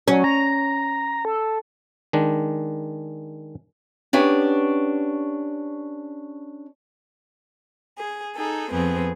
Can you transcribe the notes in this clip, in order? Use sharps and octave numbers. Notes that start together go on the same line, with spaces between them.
F#3 C#4
A#5
A4
D#3 G#3 D4
B3 C#4 D4 G4
G#4
D#4 G#4 A4
F2 B3 C4 G#4